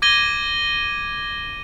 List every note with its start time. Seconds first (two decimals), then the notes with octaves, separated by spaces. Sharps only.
0.02 D6 G#6 A#6 D#7 G7